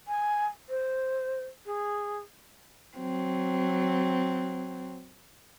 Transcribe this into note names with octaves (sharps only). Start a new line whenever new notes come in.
G#5
C5
G#4
F#3 C4